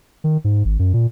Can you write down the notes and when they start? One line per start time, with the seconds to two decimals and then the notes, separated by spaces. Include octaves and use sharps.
0.24 D#3
0.44 G#2
0.65 G#1
0.79 F#2
0.94 A#2